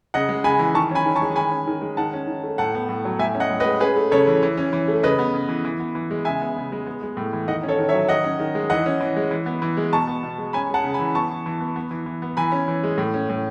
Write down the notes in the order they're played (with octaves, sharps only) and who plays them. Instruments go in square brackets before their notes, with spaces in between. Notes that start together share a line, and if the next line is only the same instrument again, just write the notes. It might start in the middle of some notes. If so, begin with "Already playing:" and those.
[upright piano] C#3 D#5 F#5
G#3
C#3 G#5 B5
E3
D#3 A5 C#6
C#4 G#5 B5
D#3
A5 C#6
G#3
D#3 G#5 B5
C#4
D#3
G#3
D#3 F#5 A5
C#4
D#3
A3
A2 F#5 A5
B3
A2
F#3
A2 E5 G#5
C#4
D#5 F#5
A2
B4 D#5
G#3
C#4 G#4 B4
A3
C#3 A4 C#5
E3
E3
C#4
E3
A3
C#3 B4 D#5
B3
C#3
E3
E3
B3
E3
G#3
C#3 E5 G#5
B3
C#3
G#3
B3
G#3
A2
E3
D#3 D#5 F#5
C#4
A4 C#5
D#3
C#5 E5
F#3
D#3 D#5 F#5
C#4
D#3
G#3
E3 D#5 F#5
C#4
E3
G#3
E3
B3
E3
G#3
B2 A5 C#6
B3
B2
G#3
C#4 G#5 B5
G#3 F#5 A5
C#3
G#5 B5
E3
B3 A5 C#6
E3
E3
B3
B3
E3
E3
B3
E3 G#5 B5
C#4
E3
G#3
A2
C#4
A2